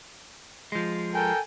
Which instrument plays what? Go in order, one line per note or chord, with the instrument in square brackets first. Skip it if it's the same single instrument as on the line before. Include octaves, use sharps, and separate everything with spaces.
[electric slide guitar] F3 G#3
[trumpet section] A4 A#4 G5 [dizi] G#5